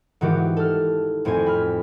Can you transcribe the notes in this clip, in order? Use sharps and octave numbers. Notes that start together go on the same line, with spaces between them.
G#2 D#3 E3 F#4 G4
A4 F6
F2 A2 C4 C5 G#5
B5 F6